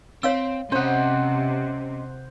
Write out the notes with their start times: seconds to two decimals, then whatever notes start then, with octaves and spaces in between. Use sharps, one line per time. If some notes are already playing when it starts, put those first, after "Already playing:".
0.23 C4 C#5 F5 E6
0.72 C3 C#4 C5 D#5 F#5